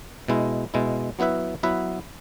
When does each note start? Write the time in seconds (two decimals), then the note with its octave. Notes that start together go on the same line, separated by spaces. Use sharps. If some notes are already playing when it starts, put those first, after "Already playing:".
0.28 B2 G#3 E4
0.74 B2 G#3 E4
1.19 F#3 B3 E4 B4 E5
1.63 F#3 B3 E4 B4 E5